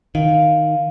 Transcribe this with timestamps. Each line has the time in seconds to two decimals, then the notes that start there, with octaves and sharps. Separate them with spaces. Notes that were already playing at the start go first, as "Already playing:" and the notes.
0.15 D#3 F5